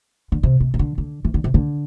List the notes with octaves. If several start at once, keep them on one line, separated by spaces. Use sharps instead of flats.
D3
C3
C3
C3
D3
D3
E3
D3
C3
D3